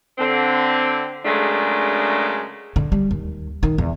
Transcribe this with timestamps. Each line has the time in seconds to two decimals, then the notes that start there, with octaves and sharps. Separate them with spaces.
0.18 D3 C4
1.25 C#3 F#3 G#3 A3 D4 A#4
2.76 D3
2.92 G3
3.11 D#2
3.63 D#3
3.78 E2